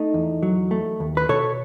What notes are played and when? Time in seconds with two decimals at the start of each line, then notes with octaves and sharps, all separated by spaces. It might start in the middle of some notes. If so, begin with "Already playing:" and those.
Already playing: A3 D#4
0.14 E2
0.43 F#3
0.71 A3
1.00 D#2
1.17 B4
1.29 B2 A4 C#5